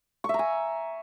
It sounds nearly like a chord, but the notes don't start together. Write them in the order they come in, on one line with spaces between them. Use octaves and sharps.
C#6 E5 A#5 G#5